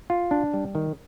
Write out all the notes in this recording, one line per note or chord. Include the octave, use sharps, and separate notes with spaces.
F4
D4
G3
D#3